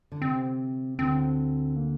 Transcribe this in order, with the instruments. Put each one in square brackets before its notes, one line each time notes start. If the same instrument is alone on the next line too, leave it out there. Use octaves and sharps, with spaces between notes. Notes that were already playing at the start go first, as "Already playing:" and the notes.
[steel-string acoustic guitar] D3
[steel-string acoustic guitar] C3 [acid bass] C4
[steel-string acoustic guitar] D2 D3 [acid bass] C4
[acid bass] A#3